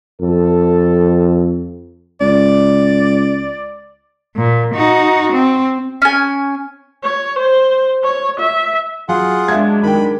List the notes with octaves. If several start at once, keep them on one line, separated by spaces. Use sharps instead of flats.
F2 A4
C#2 D5
A#2
D#4 F#4
C4
C#4 G#5
C#5
C5
C#5
E5
F#3 F4 G#4 F#5
F#3 G#3 D4 E5 G#6
D#3 G5 B5